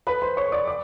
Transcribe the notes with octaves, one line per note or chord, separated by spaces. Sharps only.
B4 B5
C5 C6
C#5 C#6
D5 D6
D5 D6